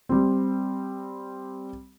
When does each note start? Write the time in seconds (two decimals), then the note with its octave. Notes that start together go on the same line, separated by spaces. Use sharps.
0.09 G3 C4